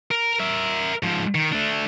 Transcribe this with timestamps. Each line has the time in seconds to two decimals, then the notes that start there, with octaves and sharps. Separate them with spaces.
0.11 A#4
0.40 A#4 E5
1.03 G#2 F3
1.35 D#3
1.52 A3 D4